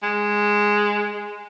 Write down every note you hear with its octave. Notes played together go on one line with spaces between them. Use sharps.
G#3